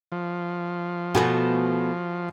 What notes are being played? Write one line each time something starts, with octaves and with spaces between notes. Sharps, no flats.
F3
B2 A3 B3 F#4 G#5